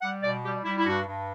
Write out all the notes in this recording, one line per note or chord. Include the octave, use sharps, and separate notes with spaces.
G3 F#5
B2 D5
G3 G4
G3 E4
E4
G2 F#4
G2